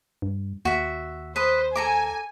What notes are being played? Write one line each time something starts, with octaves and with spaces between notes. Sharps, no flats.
G2
D#2 F#4 E5
B4 C5 D#6
A4 G#5 A#5 D6